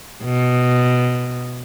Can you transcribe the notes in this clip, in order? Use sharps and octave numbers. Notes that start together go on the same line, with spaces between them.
B2